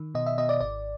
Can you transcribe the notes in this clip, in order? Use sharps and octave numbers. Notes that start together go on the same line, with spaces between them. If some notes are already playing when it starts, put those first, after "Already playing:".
Already playing: D#3
B2 D#5
E5
B2 D#5
D5
G#1 D5